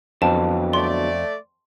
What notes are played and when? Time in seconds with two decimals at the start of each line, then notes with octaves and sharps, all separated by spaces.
0.22 F2 D3 F#3 B3 A5
0.73 A3 D5 C6